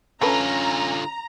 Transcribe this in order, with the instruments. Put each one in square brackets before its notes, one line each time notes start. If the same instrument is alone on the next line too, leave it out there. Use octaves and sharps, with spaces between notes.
[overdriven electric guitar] D3 F4 [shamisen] A3 A4 B4 [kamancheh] C#4 [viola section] A#5